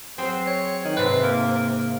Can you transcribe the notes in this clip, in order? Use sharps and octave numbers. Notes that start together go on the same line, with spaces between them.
F#3 C4 G#4 C5
C#5
D#3
G#2 C3 B4
A#3